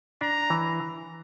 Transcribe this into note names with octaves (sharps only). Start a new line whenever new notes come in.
D4 A#5
E3